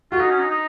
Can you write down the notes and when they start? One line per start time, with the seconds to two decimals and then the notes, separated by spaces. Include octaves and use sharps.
0.11 F4 F#4
0.21 D#4
0.30 C#4
0.39 D#4
0.50 D#4